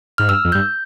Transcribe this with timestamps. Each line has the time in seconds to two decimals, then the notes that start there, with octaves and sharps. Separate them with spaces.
0.18 G#2 F6
0.28 G2 E6
0.45 F2
0.52 G2 G6